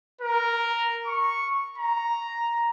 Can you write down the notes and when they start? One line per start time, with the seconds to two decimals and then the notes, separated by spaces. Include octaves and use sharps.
0.21 A#4
1.07 C#6
1.78 A#5